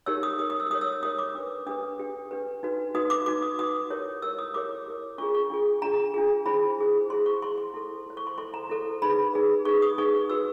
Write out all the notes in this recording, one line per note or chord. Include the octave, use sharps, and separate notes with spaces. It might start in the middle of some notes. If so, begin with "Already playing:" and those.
D#4 G4 A#4 C#5 E6
D#6
D#4 G4 A#4 C#5 D#6
D#6
E6
D#4 G4 A#4 C#5 D#6
E6
E6
D#4 G4 A#4 C#5 D#6
D6
D4 G4 B4
D4 G4 B4 D#6
D4 G4 B4
D4 G4 B4
D#4 F#4 B4
D#4 F#4 B4 D#6
D6
D#4 F#4 B4 D6
D#6
D#4 F#4 B4 D#6
E4 G4 A#4 C#5
E4 G4 A#4 C#5 E6
D#6
E4 G4 A#4 C#5 D6
E4 G4 A#4 C#5
D4 F4 G#4 C#6
C#6
D4 F4 G#4
D4 F4 G#4 A#5
D4 F4 G#4
E4 G#4 C5 B5
E4 G#4 C5
E4 G#4 C5 C6
C#6
E4 G#4 C5 C6
C6
E4 A4 C5
E4 A4 C5
C#6
C6
E4 A4 C5 C6
A#5
E4 A4 C5
D#4 G#4 B4 B5
D#4 G#4 B4
D#4 G#4 B4 C#6
D#6
D#4 G#4 B4 C#6
D#4 F#4 B4 E6